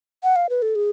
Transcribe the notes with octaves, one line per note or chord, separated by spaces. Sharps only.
F#5
F5
B4
A4
G#4